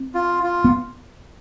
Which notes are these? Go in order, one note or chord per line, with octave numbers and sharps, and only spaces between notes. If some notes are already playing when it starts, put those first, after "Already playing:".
Already playing: C4
F4
F4
B3